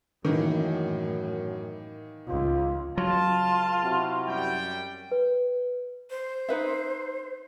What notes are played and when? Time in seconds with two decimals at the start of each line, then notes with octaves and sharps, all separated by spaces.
0.25 F#2 A2 D#3 E3 A#3
2.28 C#2 F4
2.98 C#2 F#3 F4 A5
3.84 C3 E4 F#4
4.27 F#2 G3 G5
5.12 B4
6.10 C5
6.49 D#4 B4 E5